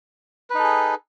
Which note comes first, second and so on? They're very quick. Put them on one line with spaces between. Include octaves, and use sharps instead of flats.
B4 D#4 A4 G#4